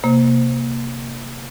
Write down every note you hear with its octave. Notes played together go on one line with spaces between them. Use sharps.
C3 A#3